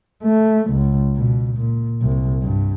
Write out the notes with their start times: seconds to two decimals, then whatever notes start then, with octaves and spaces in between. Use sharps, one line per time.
0.24 A3
0.71 C#2
1.16 B2
1.56 A#2
2.01 C2
2.42 G2